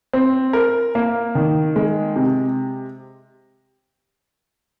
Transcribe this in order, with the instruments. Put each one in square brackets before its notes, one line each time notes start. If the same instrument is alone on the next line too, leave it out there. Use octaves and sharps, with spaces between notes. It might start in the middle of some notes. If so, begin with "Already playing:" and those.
[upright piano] C4
A#4
A#3
D#3
G#3
C3